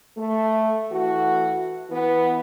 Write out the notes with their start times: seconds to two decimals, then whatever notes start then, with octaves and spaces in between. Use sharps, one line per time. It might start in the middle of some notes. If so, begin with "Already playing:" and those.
0.17 A3
0.92 E3 A3 F#4
1.90 E3 B3